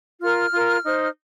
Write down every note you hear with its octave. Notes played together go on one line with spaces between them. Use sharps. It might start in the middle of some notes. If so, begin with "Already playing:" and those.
F4 A#4 F6
F4 A#4
D#4 C5